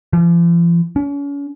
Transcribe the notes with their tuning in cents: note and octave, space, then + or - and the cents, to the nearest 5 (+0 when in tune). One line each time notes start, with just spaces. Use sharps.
F3 -45
C#4 +40